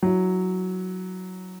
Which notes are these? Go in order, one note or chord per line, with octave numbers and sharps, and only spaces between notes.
F#3 E4